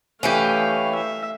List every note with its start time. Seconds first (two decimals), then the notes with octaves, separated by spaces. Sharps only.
0.23 E3 A3 C#4 G4 F5
0.95 E5